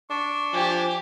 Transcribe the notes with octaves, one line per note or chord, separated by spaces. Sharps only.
D4 C#6
F3 G4 G#5